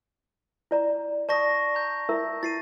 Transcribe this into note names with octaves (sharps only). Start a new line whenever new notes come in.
E4 D5 A#5
D5 A5 C#6 D#6 A#6
A#5 G6
E4 A#4 E5
E4 A6 C7 D#7